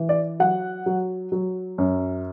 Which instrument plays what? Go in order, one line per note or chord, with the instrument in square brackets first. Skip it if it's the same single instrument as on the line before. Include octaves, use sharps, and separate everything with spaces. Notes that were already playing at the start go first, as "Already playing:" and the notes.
Already playing: [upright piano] E3
D5
F#3 F#5
F#3
F#3
F#2